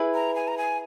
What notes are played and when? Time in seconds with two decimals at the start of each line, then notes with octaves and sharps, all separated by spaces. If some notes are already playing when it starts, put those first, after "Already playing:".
Already playing: E4 G#4 B4
0.14 A#5
0.35 G#5
0.48 A#5
0.58 G#5